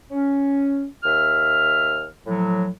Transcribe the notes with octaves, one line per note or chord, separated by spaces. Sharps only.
C#4
D#2 E5 F6
A2 F3 F#3